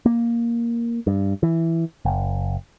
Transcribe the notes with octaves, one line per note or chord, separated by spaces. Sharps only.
A#3
G2
E3
F#1